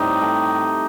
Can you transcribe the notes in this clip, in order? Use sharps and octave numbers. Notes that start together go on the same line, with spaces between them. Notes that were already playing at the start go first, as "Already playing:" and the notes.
Already playing: A2 G3 C4 D#4 G4
A3